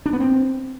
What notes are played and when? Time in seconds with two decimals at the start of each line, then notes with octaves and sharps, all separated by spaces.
0.06 D4
0.13 B3
0.20 C4